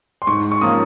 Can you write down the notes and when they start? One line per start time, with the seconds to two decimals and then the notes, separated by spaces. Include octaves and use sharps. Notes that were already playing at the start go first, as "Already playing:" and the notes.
0.22 C6
0.27 G#2 C#6
0.52 C#6
0.61 F3 A#3 C#4 D#6